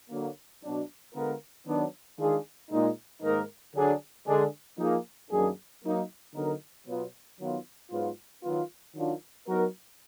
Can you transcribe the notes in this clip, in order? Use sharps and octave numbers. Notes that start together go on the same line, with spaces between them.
D3 F#3 A#3
B2 F#3 D4
D3 G#3 B3 F4 A#4
D#3 F#3 B3 D4
D#3 G#3 D4 F4 G#4
A#2 G#3 D#4
G#2 D#3 A#3 D#4 A#4
D3 F#3 D4 G#4
D3 G#3 D4 G#4
F3 A#3 D#4 G#4
F#2 D#3 A#3 D4 G#4
F#3 A#3 D#4
D3 F#3 B3 D#4 A#4
B2 F#3 B3 F4
D#3 F#3 B3 F4
G#2 F#3 B3 F4
D#3 F#3 B3 F4
D#3 F#3 D4 F4
F#3 B3 D#4 F#4 A#4